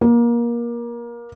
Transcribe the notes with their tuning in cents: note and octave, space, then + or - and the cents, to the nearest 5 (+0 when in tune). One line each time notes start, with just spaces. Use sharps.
A#3 +25